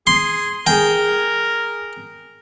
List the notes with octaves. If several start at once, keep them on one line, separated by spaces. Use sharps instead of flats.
G#4 C6
G#4 A#4 G5 G#5